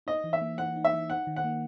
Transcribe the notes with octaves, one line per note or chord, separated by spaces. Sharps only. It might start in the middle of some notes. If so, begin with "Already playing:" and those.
D#4 D#5
E3
E5
A#3
E3 F#5
D#4
E5
E3
D#4 F#5
D#3
F#5
A#3